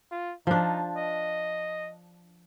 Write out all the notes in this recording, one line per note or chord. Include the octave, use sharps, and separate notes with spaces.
F4
F3 D4 D#4
D#5